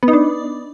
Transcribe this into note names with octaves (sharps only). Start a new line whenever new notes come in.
B3
D#4
D4